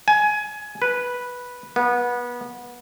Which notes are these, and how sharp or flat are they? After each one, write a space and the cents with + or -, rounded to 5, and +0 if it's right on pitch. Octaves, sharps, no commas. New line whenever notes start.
G#5 +20
B4 -5
B3 -25